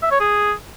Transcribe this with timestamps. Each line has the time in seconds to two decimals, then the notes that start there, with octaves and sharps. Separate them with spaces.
0.03 E5
0.11 C#5
0.20 G#4